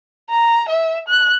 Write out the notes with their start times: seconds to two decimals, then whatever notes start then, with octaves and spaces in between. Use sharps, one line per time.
0.30 A#5
0.69 E5
1.08 F#6